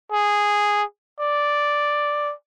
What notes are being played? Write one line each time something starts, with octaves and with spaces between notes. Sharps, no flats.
G#4
D5